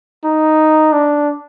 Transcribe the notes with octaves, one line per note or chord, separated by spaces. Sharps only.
D#4
D4